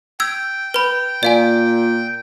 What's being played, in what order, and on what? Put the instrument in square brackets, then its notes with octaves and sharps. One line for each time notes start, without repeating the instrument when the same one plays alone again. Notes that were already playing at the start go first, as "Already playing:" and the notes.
[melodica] G5 [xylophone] E6 G#6
[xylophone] B4 B5
[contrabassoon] A#2 [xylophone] D5 F5 G#5